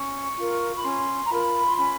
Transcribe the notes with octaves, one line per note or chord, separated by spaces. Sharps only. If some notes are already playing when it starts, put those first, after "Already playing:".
Already playing: C#4 C#6
F4 A#4
B5
C#4 C6
A#5
F4 A#4 B5
C6
C#4 B5